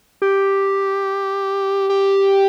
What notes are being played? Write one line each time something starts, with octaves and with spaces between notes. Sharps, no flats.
G4
G4